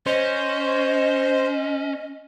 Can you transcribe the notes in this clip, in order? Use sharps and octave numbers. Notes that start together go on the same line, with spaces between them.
C#4 C5 D#5